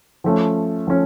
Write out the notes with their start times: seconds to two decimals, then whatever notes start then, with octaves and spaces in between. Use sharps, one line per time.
0.24 F3 A3 C#4
0.87 F3 A3 C#4